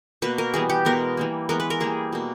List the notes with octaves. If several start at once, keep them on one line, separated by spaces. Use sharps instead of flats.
B2 A#3 B4
A#4
E3 G3 B3 G#4
G4
B2 G#3 B3 A#4
E3 G3 A#3
E3 G#3 B3 A#4
B4
A#4
E3 G3 A#3 G#4
B2 A#3